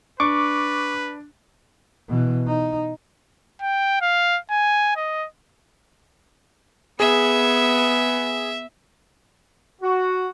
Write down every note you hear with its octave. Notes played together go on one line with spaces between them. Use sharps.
D4 B4 C#6 D6
B2 E3
D#4
G5
F5
G#5
D#5
B3 G#4 E5
F#4